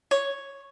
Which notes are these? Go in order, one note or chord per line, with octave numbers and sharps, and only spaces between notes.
C#5